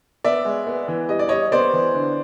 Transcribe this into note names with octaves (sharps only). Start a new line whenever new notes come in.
B3 D5 E5
G#3
B3
E3
G3 D#5
D5
G3 C#5 D#5
B3 C5 D5
E3
D3